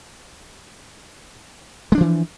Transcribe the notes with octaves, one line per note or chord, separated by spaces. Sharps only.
E3 F3 G#3 D4